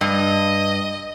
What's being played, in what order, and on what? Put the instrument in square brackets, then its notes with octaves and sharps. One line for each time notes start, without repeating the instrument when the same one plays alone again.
[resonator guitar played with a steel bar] G2 [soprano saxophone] D#5